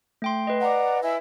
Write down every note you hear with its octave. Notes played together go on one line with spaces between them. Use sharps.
A3 G5 C6
B4 D#5
D5 F#5 A#5
E4 G#5 E6